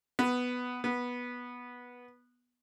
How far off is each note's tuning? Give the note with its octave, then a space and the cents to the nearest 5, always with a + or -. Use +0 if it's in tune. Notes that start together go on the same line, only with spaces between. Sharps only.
B3 +5
B3 -10